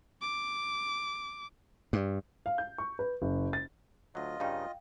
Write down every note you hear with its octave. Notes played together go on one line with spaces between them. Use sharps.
D6
G2
F5
G6
C#6
B4
F#1
A6
D2 F#3 F4 D#5
G2 C#3 D#4 F5 G5